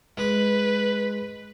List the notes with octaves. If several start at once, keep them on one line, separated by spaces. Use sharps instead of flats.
G#3 B4 D6